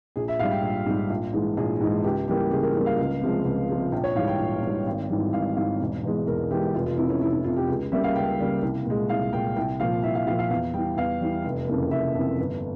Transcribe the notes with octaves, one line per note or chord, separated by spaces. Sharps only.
A#1 G#4
E5
G#2 G3 F5
G5
A#1
G#2 G3
A#1
G#2 E3 G#3
A#1 G#4
G#2 E3 G#3
C#2 G4
C#3 E3 G3 A#3 G4
C#2 G#4
A#4
C#3 E3 G3 A#3
F5
C#2
C3 F3 G#3
C#2
C3 F3 G#3
A#1 G5
C#5
G#2 E3 G3 F5
G5
A#1
G#2 E3 G3
G#1
G#2 E3 G3
G#1 F5
G#2 E3 G3 F5
E1
E2 E3 G#3
E1 A#4
E2 E3 G#3 G4
F1 F4
F4
F2 C3 E4
C#4
F1 E4
E4
F2 C3 F4
G4
C#2 G#4
C#3 G3 A#3 E5
F5
C#2 G5
C#3 G3 A#3
C2
A#2 G#3
C2 F5
A#2 G#3 G5
C2 G5
A#2 F3 F5
C2 E5
F5
A#2 F3 F5
F5
E2 F5
E3 G3 G5
E2 F5
E3 G3
F1
F2 C#3 E3 A#3
F1 E5
F2 C#3 E3 A#3
G1